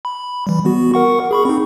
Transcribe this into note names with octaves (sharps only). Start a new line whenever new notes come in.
B5
E3 G3
B3 F#4
A#4 F#5 C#6
G#4 B5 C#6
C4 D#4